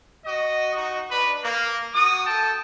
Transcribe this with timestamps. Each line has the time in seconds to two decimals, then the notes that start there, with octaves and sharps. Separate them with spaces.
0.25 F#4 D#5
0.73 D#4 F#4
1.10 D4 B4
1.43 A#3
1.94 F#4 D#6
2.26 A4 G5 A5